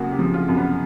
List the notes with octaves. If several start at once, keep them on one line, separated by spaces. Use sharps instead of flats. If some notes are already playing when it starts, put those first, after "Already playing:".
Already playing: F#2 C#3 A#3 F#4
G4
F3
F4
F#2
B3